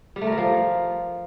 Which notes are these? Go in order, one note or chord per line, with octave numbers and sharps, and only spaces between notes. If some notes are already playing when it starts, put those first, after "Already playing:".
G3
A3
A#4
G3
F3